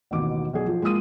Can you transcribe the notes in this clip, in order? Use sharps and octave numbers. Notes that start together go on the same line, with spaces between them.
A1 D#2 B2 D6
B1 G#4
F3
G#3 A#3 F4 D#6 D#7